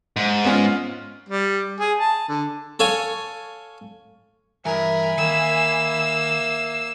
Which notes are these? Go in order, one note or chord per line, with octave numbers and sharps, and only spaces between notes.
G#2
B3 C#4 F4
G3
G#4
A5
D3
A4 C#5 F5 G#5
G2 E3 A#4 E5 G#5 A#5 B5
D#3 A#3 E6